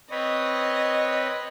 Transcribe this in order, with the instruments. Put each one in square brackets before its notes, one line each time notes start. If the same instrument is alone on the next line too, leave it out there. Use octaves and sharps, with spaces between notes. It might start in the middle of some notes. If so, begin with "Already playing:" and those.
[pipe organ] C4 B4 C#5 [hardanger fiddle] D#5